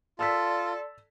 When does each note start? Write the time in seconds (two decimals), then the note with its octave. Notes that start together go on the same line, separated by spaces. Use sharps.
0.19 F4 A4 D5 A5 C6 E6 B6